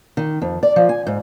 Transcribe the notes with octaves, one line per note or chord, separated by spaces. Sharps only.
D#3
F2
D5
F3
G#5
G#2